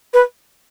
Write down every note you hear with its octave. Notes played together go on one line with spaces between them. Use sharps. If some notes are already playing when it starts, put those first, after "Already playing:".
B4